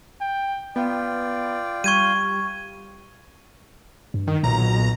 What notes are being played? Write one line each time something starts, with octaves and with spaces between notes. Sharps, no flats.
G5
B3 F4 D5 G5
G3 C#6 G#6 D#7
G2
D#3
B1 A#2 A#5